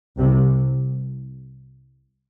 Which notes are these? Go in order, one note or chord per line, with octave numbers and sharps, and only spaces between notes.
C2 C3